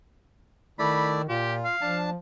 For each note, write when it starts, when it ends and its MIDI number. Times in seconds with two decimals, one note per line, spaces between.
0.79 1.24 51
0.79 1.22 57
0.79 1.22 64
0.79 1.22 74
0.79 1.09 83
1.29 1.65 46
1.29 1.76 65
1.29 1.54 67
1.65 1.98 77
1.81 2.16 53
1.81 2.10 62
1.81 2.10 81